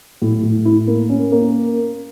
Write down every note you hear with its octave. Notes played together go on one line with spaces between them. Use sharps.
A2
A2
E4
A#3
C#4
A#3